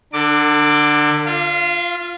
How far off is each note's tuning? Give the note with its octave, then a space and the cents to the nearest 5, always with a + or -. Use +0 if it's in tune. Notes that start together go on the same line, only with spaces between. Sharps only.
D3 +15 A#4 -45 D6 +0
F4 +0 F5 -35